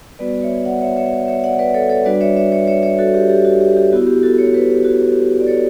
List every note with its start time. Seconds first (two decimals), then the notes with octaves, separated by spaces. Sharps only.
0.19 G3 B3 F#4 B4 D5
0.42 C#5 E5
0.65 D5 F#5
0.81 C#5 E5
0.97 C#5 E5
1.27 C#5 E5
1.43 D5 F#5
1.59 B4 D5
1.74 A4 C#5
1.89 A4 C#5
2.05 G3 D4 F#4 B4 D5
2.21 C#5 E5
2.36 C#5 E5
2.52 C#5 E5
2.67 C#5 E5
2.83 C#5 E5
2.98 F#4 A4
3.14 G4
3.29 G4
3.45 F#4
3.61 G4
3.77 G4
3.93 B3 F#4
3.95 E4
4.07 G4
4.23 F#4 A4
4.38 A4 C#5
4.54 G4 B4
4.70 G4
4.85 F#4
5.09 G4
5.40 D5
5.47 A4 C#5